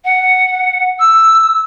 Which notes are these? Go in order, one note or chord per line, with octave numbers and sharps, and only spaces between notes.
F#5
E6